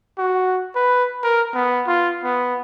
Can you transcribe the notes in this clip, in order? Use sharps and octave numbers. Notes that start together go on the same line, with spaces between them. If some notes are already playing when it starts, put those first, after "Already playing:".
F#4
B4
A#4
B3
F4
B3